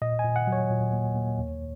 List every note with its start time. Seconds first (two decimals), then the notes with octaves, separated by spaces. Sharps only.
0.02 A#2 D#5
0.19 G#5
0.24 A#2
0.36 F#5
0.47 F#3
0.52 C#5
0.70 A#2
0.93 A#3
1.16 A#3
1.38 D#2